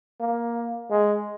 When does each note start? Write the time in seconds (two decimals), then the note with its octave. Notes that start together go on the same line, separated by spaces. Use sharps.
0.20 A#3
0.90 G#3